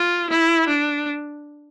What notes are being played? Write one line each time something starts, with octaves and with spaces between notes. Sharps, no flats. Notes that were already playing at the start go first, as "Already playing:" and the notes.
Already playing: F4
E4
D4